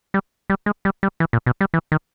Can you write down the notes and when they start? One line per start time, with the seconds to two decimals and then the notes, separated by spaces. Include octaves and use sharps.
0.14 G3
0.50 G3
0.66 G#3
0.85 G3
1.03 G3
1.20 E3
1.33 A#2
1.46 B2
1.61 G3
1.74 E3
1.92 D#3